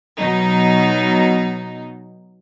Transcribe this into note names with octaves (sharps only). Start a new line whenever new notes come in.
B2 F#3 D#4